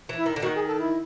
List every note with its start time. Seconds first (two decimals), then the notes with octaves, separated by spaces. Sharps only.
0.09 E3
0.17 E4
0.26 D#3
0.36 D3
0.42 D#3 F#4
0.55 G#4
0.67 A4
0.79 E4